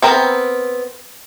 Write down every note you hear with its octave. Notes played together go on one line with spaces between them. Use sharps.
B3 C4 A#4